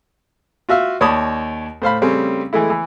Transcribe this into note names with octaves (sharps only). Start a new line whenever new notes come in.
F4 F#4 E5 F5
D#2 C#5 D5 A5 B5 D#6
A2 C5 F5 B5
C#3 G3 A3 C4 C#4 G4
E3 G#3 A3 E4
E3